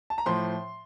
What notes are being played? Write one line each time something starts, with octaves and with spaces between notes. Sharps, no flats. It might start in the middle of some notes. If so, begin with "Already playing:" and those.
A5
A#5
A2 F3 C6